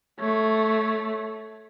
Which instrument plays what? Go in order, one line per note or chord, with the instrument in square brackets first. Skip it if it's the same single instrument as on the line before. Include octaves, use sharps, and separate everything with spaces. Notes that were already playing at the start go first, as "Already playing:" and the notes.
[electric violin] A3 [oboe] C#5